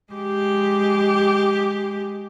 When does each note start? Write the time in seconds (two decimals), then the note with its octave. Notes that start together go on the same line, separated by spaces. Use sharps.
0.13 G#3 G4